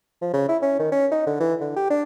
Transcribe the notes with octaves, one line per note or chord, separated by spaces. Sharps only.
F3
C#3
E4
C#4
D#3
C#4
D#4
D3
E3
D3
G4
D4